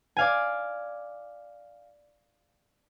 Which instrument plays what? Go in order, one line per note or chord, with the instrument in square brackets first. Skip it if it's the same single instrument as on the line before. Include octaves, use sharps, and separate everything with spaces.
[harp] D5 F5 G#5